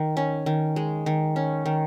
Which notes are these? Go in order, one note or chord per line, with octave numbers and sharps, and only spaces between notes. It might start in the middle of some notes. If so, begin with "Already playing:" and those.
Already playing: D#3
C#4
D#3
G#3
D#3
C#4
D#3